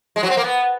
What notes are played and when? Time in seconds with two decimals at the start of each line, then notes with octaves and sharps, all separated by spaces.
0.16 G#3
0.23 F#3
0.30 C4
0.37 A#3
0.44 B3